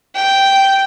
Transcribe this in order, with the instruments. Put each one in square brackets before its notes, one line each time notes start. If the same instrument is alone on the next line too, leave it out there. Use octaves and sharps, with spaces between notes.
[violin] G5